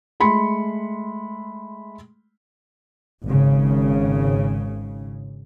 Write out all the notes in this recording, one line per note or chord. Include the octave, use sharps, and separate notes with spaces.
G#3 A3 B5 C6 C#7
G#1 C#3